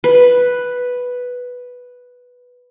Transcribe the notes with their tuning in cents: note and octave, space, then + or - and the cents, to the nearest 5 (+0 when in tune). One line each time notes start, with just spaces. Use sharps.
B4 +0